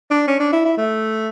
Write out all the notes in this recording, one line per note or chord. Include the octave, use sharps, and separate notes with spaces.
D4
C#4
D4
E4
E4
A3